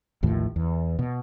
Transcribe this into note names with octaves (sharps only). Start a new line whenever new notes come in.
A1 D#2 A2 F3
E2
B2